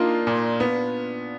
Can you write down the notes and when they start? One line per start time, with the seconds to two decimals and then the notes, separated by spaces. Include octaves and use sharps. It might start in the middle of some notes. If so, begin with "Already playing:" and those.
Already playing: A#3 D4 D#4 F4
0.27 A#2
0.60 B3